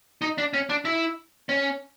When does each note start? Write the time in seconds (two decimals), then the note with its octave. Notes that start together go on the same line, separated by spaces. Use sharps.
0.22 D#4
0.38 D4
0.54 C#4
0.69 D4
0.85 E4
1.49 C#4